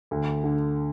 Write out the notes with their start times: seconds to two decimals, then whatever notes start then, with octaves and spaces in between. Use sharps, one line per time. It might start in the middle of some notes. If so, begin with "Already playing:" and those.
0.11 D2
0.44 D3